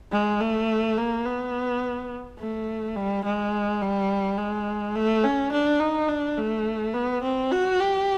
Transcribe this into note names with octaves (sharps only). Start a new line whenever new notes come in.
G#3
A3
A#3
B3
A3
G3
G#3
G3
G#3
A3
C#4
D4
D#4
D4
A3
B3
C4
F#4
G4